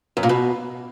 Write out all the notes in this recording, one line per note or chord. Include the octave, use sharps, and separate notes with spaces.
F#2
A#2
B2